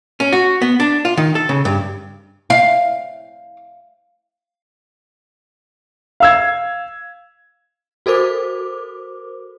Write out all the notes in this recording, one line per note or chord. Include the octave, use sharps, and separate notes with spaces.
C#4
F#4
B3
D4
F4
D#3
A4
C#3
G2
F5
F5 E6 G#6
F#4 A4 A#4 C5 D6